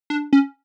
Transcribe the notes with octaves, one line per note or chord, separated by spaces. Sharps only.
D4
C#4